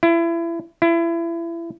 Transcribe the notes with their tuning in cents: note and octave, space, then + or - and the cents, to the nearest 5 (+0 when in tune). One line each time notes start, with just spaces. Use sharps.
E4 +30
E4 +30